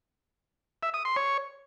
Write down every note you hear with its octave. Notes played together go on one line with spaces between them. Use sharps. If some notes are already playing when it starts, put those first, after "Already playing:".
E5
D#6
C6
C#5